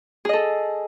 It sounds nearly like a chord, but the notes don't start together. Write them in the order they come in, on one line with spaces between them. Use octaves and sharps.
G#4 D#5 A4